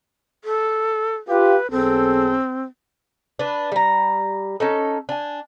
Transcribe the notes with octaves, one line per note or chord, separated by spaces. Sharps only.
A4
F4 G4 B4
B1 C4 G#4 A4
D4 B4
G3 A#5
C#4 D#4 A4
D4 G#5